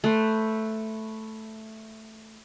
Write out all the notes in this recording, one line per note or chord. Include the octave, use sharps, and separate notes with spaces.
A3 B4 C5